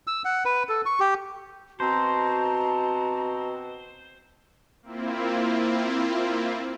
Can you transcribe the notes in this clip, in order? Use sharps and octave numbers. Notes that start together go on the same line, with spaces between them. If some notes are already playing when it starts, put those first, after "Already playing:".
E6
F#5
B4
A4
C#6
G4
B2 C4 F#4 C5 A5 A#5
A#3 C4 E4 F4